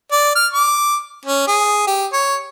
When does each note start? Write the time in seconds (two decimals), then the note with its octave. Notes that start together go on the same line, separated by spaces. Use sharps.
0.12 D5
0.35 F6
0.54 D6
1.26 C#4
1.48 G#4
1.87 G4
2.13 C#5